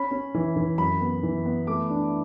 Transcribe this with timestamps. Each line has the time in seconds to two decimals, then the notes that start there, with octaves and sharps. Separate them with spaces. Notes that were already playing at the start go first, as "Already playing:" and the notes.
Already playing: C#4 B5
0.11 C#4
0.34 E3
0.56 E3
0.78 F#2 B5
1.01 B3
1.23 E3
1.46 B3
1.67 A3 D6
1.90 D4